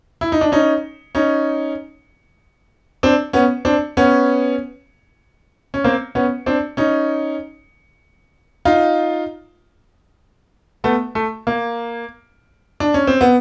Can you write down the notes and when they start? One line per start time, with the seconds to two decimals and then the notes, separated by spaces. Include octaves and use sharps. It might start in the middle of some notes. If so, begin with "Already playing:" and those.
0.21 E4
0.32 D#4
0.41 D4
0.52 C#4 D#4
1.15 C#4 D#4
3.03 C4 D4
3.33 B3 C#4
3.65 C4 D4
3.97 B3 C#4
5.74 C#4
5.84 A#3 C4
6.15 B3 C#4
6.46 C4 D4
6.77 C#4 D#4
8.65 D#4 F4
10.84 A3 B3
11.15 A3
11.47 A#3
12.80 D4
12.94 C#4
13.07 C4
13.21 B3